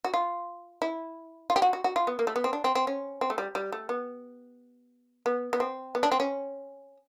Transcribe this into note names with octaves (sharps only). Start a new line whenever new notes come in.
F#4
F4
E4
F4
G4
F#4
F#4
F#4
F4
B3
A#3
A3
B3
C4
D4
C4
C4
C#4
C4
A3
G3
G3
A3
B3
B3
B3
C4
B3
D4
C4
C#4